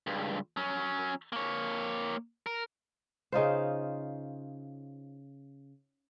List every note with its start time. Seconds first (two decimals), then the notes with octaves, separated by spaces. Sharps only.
0.07 C#2 G2
0.57 F#3 C#4
1.33 A#3 C#5
2.46 A#4
3.32 C#3 D#4 F4 C5